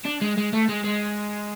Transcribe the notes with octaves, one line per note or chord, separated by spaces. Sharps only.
D4
G#3
G#3
A3
G#3
G#3